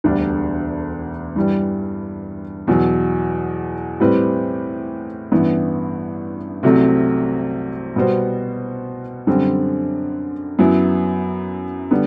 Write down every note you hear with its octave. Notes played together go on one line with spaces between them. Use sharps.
E1 D2 D3 G3 D4
G2 E3 G3
E2 B2 F#3
A2 G3 C4 G4 B4
A1 G2 E3 B3 E4
C2 C3 F#3 A3
B2 G3 B3 F#4 C5
F#2 D3 G3 C4
F#2 F#3 B3 E4
D3 G3 B3